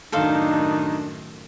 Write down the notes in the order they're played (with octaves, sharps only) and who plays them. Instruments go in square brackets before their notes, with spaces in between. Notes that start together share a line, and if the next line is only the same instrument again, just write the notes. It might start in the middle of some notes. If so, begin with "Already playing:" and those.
[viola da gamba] F#2 A2 D#3 [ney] D4 [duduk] D#4 [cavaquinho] A4 C5 F5